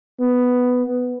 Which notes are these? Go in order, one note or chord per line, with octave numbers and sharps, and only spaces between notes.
B3